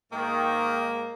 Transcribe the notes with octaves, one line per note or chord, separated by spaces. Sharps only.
G#2 D#3 A#3